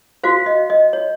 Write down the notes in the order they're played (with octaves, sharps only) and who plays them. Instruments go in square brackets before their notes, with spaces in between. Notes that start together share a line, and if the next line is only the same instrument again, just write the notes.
[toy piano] F#4 C5 F5
D#5
D#5
C#5